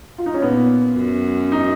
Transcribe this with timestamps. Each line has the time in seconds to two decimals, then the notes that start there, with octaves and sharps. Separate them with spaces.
0.18 F4
0.26 D#4
0.34 C#4
0.42 A#2 B3
0.97 F#2
1.52 D#4